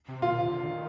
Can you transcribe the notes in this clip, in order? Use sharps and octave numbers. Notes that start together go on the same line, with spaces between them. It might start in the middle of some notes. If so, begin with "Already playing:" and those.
C3
A#2 F4
C3
D3
D#3